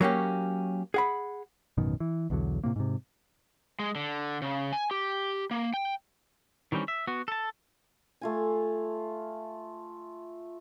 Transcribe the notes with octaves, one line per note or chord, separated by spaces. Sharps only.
F#3 A#3 C#4 G4
G#4 F#5 B5
A1 F#2 B2 D#3
E3
B1 E2 D3 F#3
A2 C3 A#3
G#2 C3
G#3
D3
C#3
G#5
G4
A#3
G5
D#3 E3 G3 C4 C#4
E5
B3 F#4
A4 A5
A3 F4 G#5